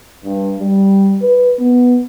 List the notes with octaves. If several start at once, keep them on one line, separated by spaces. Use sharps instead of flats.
G2
G3
B4
B3